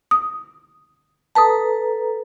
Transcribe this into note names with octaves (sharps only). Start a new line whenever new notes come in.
D#6
A4 B4 A5 A#5 D#6